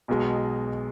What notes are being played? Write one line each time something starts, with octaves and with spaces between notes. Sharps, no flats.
B1 B2 G#3